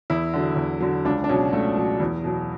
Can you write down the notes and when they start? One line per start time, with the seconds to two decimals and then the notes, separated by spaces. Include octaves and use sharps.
0.10 E2 E4
0.33 D3 F#3
0.57 E2
0.80 D3 F#3
1.05 C#2 D4
1.24 D4
1.29 B2 F#3 C#4
1.52 C#2 A3
1.76 B2 F#3
2.00 E2
2.24 B2 F#3